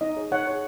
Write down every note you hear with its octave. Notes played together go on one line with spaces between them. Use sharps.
D#4 D#5
G#4 C#5
D#4 C#5 F#5
G#4 C#5